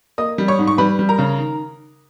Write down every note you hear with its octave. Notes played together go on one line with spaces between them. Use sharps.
A#3 D#5 D#6
G3
C#5 C#6
G#2
C#6
G3 B4 B5
G3
A#4 A#5
C#3
D#3